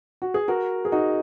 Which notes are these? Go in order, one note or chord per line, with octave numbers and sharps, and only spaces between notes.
F#4
G#4
F#4 A#4
G#4
D#4 F#4